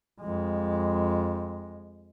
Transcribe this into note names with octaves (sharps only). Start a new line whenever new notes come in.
F2 G#3